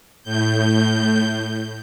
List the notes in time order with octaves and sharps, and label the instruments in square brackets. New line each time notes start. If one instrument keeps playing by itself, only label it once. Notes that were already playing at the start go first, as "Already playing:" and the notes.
[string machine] A2 G6